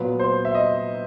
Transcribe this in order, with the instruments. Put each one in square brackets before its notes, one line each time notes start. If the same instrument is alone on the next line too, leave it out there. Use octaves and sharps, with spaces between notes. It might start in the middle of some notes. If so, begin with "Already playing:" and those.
Already playing: [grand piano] A#2 F#3 B3 B4
C5
E5
D#5